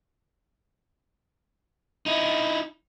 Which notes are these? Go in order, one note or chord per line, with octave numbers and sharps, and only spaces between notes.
D#4 E4